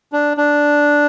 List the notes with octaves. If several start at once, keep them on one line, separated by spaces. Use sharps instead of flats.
D4
D4